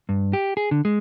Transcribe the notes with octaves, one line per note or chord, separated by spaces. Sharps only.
G2
G4
G#4
D3
G#3